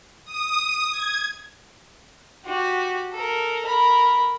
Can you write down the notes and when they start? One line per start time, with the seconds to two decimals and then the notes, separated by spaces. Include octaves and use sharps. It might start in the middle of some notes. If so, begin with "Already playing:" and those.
0.25 D#6
0.91 G#6
2.45 F#4 G4
3.13 A4 A#4
3.65 A#4 B5